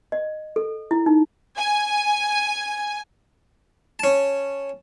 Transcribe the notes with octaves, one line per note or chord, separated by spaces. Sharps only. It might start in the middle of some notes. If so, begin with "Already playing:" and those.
D#5
A4
E4
D#4
G#5
C#4 A5